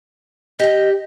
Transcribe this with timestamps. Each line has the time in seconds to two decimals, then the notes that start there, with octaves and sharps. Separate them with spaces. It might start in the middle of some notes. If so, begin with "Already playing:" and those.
0.59 G4 D#5 G5